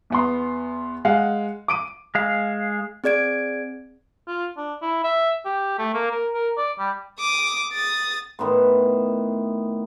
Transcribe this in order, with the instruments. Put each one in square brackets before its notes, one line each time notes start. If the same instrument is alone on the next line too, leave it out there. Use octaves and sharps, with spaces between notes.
[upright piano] E2 B3 C6
G#3 F5 F#5
D6 D7 D#7
[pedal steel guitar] G#3 F5
[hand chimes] C4 G#4 D5 G#6 D7
[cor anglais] F4
D4
E4
E5
G4
A3
A#3
A#4
A#4
D5
G3
[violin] D6 D#6
D#6 A6
[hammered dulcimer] A2 D#3 B3 C6